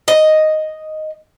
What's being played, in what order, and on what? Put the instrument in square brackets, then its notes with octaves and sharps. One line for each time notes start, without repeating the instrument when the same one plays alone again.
[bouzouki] D#5